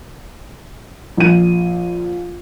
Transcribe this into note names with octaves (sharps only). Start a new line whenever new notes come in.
A#1 D#7